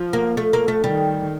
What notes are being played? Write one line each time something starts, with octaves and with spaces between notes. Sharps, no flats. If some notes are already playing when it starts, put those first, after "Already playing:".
Already playing: F3
A#3
A3
A#3
A3
D#3 G3